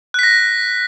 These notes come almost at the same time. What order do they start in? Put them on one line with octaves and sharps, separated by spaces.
F#6 B6 A#6